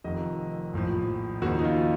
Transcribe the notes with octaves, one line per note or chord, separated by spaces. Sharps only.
F1 F2 D#3 D#5
A#1 A2 F3
D#2 C#3 F3 F#4
D#4
F4